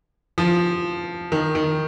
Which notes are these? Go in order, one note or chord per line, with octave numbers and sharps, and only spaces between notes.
F3
D#3
D#3